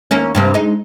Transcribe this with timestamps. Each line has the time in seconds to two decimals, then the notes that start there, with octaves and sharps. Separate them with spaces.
0.11 D#2 A#3 C#4
0.35 G2 C3 A#3
0.54 G#3 D#4